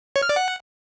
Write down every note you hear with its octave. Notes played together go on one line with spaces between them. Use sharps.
C#5
F6
D5
F#5